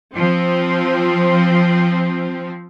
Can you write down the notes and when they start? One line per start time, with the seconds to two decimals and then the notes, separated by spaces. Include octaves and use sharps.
0.15 F3 C4